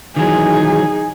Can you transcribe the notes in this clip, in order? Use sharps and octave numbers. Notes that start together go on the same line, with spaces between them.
D#3 E3 F#3 D#4 G#4